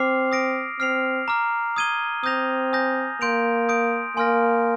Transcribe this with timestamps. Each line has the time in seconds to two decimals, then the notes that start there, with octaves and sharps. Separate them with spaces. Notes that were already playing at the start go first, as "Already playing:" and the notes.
Already playing: C4 D6 F6 C7 F7
0.32 D#6 A#6 D7
0.80 C4 F6 C7 F7
1.28 A#5 D6 F6
1.77 D#6 G#6 D#7 G7
2.24 C4 D#6 G6 A#6 F7
2.73 G#5 D#6 G6 A#6
3.21 A#3 C6 G6 D7 F7
3.69 D#6 G6 D7
4.17 A#3 G#5 C6 F6 A#6